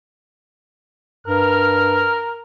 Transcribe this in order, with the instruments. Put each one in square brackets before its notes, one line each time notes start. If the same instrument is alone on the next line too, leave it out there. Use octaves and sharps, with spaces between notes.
[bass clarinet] G2 [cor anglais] A#4 [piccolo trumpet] F6